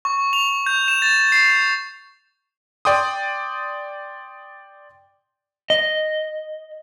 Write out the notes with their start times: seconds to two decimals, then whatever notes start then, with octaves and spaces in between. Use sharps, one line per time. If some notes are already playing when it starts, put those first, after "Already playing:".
0.05 C#6
0.33 F7
0.66 G6
0.88 E7
1.02 A6
1.32 C7
2.85 D5 G5 C6 D#6
5.70 D#5